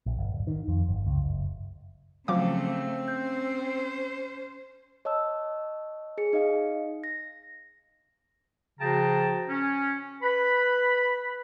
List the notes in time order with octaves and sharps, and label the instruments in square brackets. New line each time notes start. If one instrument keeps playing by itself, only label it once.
[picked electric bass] A#1
G1
D1
D#3
F2
G1
C#2
F#1
[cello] C#3 A3 [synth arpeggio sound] F3 F#3 D6 [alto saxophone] C4 [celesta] F5
[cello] C#4 C5 [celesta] G6
[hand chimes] C#5 D#5 A5 E6
G#4 C#7
D#4 D#5 F5
A#6
[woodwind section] C#3 F3 F#4 G5 A5 A#5
C#4
B4 B5